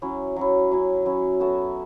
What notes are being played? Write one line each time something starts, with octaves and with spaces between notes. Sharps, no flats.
F#3 C#4 E4
F#3 C#4 E4
F#3 C#4 E4
F#3 C#4 E4
B3 F#4 A4 E5